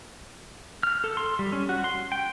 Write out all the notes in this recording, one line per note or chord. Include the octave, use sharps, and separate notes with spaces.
F6
A4
C6
G3
C#4
F#4
C6
G5